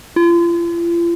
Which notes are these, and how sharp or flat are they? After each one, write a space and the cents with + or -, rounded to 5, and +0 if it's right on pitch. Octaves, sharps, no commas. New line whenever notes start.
F4 -40